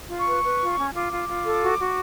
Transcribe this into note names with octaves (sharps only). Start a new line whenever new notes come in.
F4
C#6
B4
B4
F4
C#4
F4 D6
F4
F4
A4
F#4
F#4